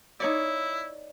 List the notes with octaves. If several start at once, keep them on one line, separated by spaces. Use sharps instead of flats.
D#4 E4 C#5 D5